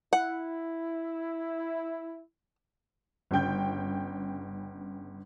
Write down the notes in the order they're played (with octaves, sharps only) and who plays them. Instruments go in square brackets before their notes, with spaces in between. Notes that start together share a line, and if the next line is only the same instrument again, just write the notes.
[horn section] E4 [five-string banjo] F#5
[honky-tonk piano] G1 C#3 G5 G6